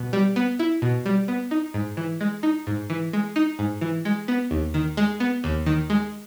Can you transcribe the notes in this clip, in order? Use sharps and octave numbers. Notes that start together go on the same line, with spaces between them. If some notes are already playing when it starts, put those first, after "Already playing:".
Already playing: B2
G3
B3
E4
B2
G3
B3
D#4
G#2
E3
G#3
D#4
G#2
E3
G#3
D#4
G#2
E3
G#3
B3
D#2
D#3
G#3
B3
D#2
D#3
G#3